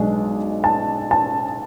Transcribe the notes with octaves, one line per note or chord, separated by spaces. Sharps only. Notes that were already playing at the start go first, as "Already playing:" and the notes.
Already playing: B1 B2 G#3 D4
A5
A5